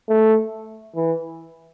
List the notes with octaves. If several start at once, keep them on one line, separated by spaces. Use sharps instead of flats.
A3
E3